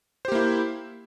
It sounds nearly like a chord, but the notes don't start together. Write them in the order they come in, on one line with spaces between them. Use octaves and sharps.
C5 G4 A#3 E4